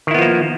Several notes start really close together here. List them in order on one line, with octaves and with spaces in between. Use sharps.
D#3 E4 B3 F3 A#3